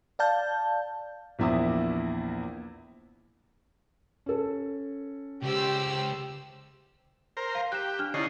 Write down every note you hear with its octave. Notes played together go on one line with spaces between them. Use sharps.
D5 F5 A5 G6
A#1 E2 E4 D6 D#6
C#4 A4
C#2 G4 C5 E6
A#4 C5
F5 A#5
G4 F#6 E7
D4 F6
D3 C#4 D#4 E4 C7